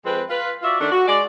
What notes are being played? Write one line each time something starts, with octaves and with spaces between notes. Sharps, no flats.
F2 G#3 C4 B4
F4 B4
F4 F#4 D5 E5
D#3 A3 D4
F#4
G#3 D5